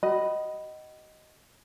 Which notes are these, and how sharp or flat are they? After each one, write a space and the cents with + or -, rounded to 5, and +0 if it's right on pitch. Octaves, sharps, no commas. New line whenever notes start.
F#4 +40 D#5 +0 B5 +0